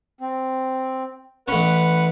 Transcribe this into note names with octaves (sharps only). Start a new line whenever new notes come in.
C4
A1 C#4 B4 F#5